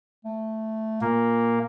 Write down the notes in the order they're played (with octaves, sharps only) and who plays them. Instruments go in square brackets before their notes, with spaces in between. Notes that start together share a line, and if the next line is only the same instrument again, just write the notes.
[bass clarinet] A3
[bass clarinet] A#2 [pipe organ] A#3